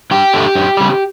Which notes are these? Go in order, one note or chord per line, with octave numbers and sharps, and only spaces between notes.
G2 G4 G5
D3 A3 D4
F#2
C#3 G3